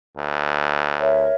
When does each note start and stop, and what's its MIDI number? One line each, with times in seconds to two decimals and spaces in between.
0.17 1.27 38
1.00 1.36 70
1.00 1.36 73
1.00 1.36 76